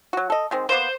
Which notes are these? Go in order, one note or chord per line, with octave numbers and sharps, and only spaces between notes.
F#3 F#4
A4 D#5
D#3 G#3 C4
A#3 B3 C5